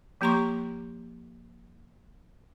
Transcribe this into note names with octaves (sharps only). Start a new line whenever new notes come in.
F3 A#3 G4 A#5 C6 C#6